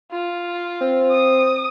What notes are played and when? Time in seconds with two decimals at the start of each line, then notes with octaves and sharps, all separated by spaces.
0.11 F4
0.81 C4
1.11 D#6